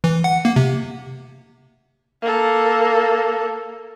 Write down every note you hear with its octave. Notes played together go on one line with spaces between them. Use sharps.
E3
F#5
A#3
C3
A#3 A4